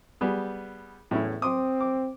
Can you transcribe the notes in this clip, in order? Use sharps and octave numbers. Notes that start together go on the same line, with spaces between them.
G3 B3 G#4
E2 A2 C#4 E4
C4 C6 D6 D#6
D6